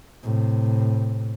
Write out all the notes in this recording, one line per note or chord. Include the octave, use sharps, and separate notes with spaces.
A2 C3